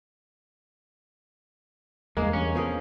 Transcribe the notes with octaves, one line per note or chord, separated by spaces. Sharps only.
E2 G2 G#3 A#3
C#4
F3 B3 G#4 A#4